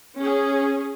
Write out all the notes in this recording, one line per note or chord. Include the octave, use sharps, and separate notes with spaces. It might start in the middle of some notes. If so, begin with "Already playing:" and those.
C#4 G#4